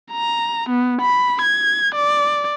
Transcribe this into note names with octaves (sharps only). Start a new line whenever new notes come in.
A#5
B3
B5
G#6
D5